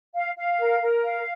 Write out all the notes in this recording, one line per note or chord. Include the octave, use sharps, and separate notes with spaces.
F5
F5
A#4
A#4
F5